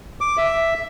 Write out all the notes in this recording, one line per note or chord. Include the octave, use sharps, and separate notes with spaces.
D6
E5